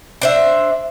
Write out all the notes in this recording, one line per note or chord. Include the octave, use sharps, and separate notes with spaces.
D4 C5 E5